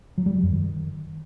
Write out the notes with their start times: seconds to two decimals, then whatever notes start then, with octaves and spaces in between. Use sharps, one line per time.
0.18 F#3
0.26 G3
0.34 F#3
0.43 F#2
0.51 D#3